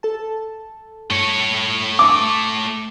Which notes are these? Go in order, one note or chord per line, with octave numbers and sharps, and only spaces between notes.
A4 A5
G2 A3 C#5
D6